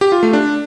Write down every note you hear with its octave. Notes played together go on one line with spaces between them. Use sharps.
G4
F4
A3
D4